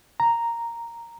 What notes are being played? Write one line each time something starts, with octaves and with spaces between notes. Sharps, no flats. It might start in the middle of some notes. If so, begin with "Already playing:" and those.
A#5